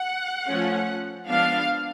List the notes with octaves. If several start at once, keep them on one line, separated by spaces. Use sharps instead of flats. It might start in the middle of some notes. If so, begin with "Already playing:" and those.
Already playing: F#5
F3 A3 C#4
F3 G#3 B3 D4 F5